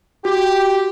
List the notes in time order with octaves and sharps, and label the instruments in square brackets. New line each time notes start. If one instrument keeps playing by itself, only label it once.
[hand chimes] F#4 [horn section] G4